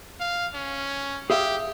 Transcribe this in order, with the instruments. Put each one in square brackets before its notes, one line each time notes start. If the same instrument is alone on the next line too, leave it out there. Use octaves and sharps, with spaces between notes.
[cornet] F5
C#4
[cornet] G4 [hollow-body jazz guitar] G#4 E5 F5